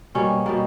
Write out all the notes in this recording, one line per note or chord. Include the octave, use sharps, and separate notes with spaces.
B2 G3 A#3 C#4
B2 G3 A#3